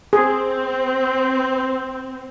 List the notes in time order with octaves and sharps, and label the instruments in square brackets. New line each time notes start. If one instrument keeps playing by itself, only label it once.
[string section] C4 [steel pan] G#4